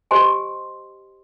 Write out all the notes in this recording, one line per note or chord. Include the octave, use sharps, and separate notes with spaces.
G4 C5 D#5 G#5 C6